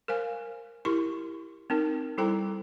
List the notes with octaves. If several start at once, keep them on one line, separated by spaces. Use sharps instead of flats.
A#4 C5 F5 G#5
E4 G4 A#4 C6 C#6
C4 D#4 A#4
G3 E4 A4 C5 G5 A#5